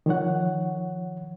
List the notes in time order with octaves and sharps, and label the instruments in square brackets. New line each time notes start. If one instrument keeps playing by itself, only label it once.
[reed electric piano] D#3 F3 C#5 F#5